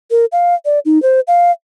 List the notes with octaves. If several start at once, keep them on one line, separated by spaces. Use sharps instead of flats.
A#4
F5
D5
D#4
C5
F5